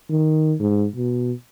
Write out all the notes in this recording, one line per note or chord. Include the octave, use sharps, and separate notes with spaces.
D#3
G#2
B2